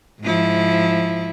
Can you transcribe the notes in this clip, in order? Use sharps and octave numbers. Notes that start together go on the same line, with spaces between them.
G#2 F3 E4